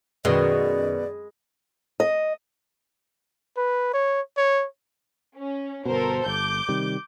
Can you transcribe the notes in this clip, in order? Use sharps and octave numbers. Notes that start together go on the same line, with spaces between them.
F#2 B2 D#3 G#3 G#4 D5 C6
D#5
B4
C#5
C#5
C#4
G1 B2 A4 A#4 C5
G1 D6 G6
C3 D#3 G3